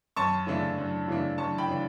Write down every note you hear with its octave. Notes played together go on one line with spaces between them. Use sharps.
F#2 A5 C#6
C#3 E3 A3 D4
F#2
C#3 E3 A3 D4
F#2 A5 C#6
G5 B5
C#3 E3 A3 D4